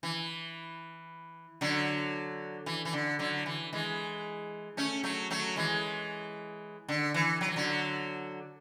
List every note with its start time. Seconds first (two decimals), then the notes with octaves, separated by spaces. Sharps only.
0.03 E3
1.61 D3 F#3
2.66 E3
2.85 E3
2.93 D3
3.19 D3 F#3
3.46 E3
3.73 E3 G#3
4.77 A3 C#4
5.03 F#3 A3
5.30 F#3 A3
5.56 E3 G#3
6.88 D3
7.14 E3
7.41 F#3
7.48 E3
7.56 D3 F#3